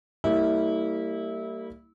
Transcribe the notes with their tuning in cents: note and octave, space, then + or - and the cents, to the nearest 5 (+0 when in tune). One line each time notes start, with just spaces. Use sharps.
G3 +0 A#3 -30 E4 -25